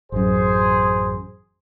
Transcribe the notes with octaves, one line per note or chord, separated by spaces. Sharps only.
A1 F#2 G#4 C5